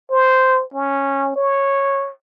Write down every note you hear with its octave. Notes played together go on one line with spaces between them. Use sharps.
C5
C#4
C#5